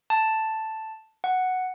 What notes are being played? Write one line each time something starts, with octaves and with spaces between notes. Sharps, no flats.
A5
F#5